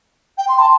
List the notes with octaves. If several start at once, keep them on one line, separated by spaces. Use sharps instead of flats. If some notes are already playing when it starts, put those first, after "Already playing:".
G5
C6
A5